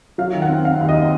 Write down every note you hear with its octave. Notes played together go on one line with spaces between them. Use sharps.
F#3 F5
D#3
F#5
C4
C4 F5
D#2
D#5
C4